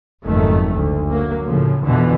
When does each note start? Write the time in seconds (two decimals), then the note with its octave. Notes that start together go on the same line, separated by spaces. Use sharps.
0.24 F#1 F2 G#2 D#3 A3
0.75 D2
1.10 F#3 A#3
1.45 A2 C#3 F3
1.84 F2 B2 D3 E3